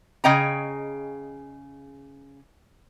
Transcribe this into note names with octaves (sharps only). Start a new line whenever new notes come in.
C#3 G#4 D#5 G5 G#5 A#5